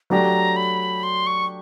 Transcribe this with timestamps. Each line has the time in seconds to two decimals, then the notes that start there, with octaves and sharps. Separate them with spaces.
0.10 F#3 A3 D4 G4 A#5
0.56 B5
1.03 C6
1.27 C#6